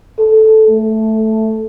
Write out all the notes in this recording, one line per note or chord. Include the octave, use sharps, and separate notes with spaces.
A4
A3